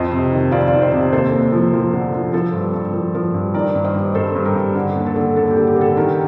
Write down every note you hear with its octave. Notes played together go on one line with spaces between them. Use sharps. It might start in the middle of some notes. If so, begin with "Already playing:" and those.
Already playing: F2 C5 D#5
C3
D#3
F2 D5 F5
D5 F5
D#3
C5 D#5
C3
D#2 A4 C5
D#2
F3
F3
D3
F3
F3 A4 C5
G2
G2
F3
F3
G2
D#3 A#4 D5
G2
C5 D#5
G2
G2 A4 C5
G2
G4 A#4
G2
D3
D#2
A4
D3
D#2 A4
G4
D3
G4
D3 A4
D#3 G4 A#4